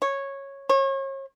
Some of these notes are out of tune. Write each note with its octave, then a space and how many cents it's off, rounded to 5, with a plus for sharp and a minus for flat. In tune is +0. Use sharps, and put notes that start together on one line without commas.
C#5 -10
C#5 -35